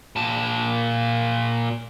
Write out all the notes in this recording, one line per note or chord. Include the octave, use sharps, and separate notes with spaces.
A#2 A5